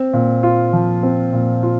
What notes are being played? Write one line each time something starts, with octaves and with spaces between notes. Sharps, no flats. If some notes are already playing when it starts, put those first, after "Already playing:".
Already playing: C4
A#2
F4
F3
C4
A#2
F4